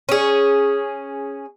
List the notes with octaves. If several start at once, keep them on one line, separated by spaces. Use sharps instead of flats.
C#4 G#4